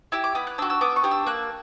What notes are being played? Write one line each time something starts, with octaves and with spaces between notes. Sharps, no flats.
E4 G4 E6
D6
B3 B5
F#6
D4 F#4 E6
E6
B3 D6
C#6
D4 G4
E6
A#3 F#6